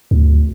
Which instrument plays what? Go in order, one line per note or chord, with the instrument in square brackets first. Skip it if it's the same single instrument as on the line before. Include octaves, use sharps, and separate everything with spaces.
[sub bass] D2